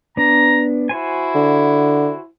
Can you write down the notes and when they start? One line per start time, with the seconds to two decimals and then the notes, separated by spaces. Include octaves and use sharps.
0.17 B3 D4 A#5
0.89 E4 F#4 C5 G#5
1.35 D3